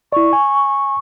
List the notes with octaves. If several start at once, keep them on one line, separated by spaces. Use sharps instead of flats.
E4 D5 C#6
G#5